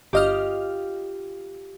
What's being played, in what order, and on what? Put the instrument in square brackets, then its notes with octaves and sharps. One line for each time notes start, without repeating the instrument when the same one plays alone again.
[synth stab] G1 D#5 F6 [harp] F4 G4